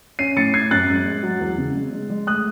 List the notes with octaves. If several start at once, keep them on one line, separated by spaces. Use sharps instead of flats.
C#4 C7 D#7
A2 A6 C#7
C#4 G#6 C7
F#2 F#6 A6
G#3
G#3
F#3
E2
C#3
G#3
G#3
G#3
A3 D#6 F#6